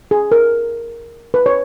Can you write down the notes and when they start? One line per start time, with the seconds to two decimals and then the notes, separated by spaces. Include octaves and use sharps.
0.11 G#4
0.32 A#4
1.34 B4
1.46 C#5